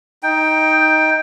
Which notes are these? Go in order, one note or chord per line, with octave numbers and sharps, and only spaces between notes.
D#4 G5